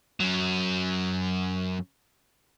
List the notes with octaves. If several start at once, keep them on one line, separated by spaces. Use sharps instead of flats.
F#2 F#3